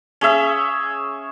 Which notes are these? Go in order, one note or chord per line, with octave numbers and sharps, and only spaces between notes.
C#4 G#4 E5